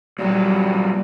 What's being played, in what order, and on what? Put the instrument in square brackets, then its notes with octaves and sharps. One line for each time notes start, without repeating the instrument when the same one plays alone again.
[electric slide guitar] A#2 F#3 [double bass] G3